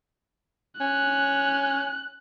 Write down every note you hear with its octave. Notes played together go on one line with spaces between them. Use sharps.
C#4 F#6